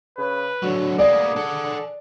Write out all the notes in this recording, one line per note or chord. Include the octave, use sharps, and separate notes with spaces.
C#3 B4
D3 F#3 F#4
A#3 B3 G#4 D5 D6
A4 F#5